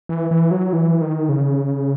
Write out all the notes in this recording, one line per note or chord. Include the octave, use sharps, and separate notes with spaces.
E3
E3
F#3
E3
D#3
C#3